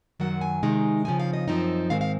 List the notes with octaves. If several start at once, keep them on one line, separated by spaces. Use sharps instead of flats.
F#2 D#3 F#3 F#5
G#5
C3 D#3 G#3 D#4
C#3 F3 C4 D#4 G#5
F5
D#5
F#2 F3 C4 D#4
G#2 D#3 G#3 C4 F5
F5